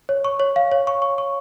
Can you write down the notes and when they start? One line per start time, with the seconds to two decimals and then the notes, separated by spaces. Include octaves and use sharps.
0.09 C#5
0.24 C#6
0.40 C#5
0.56 F5
0.72 C#5
0.87 C#6
1.02 C#6
1.18 C#6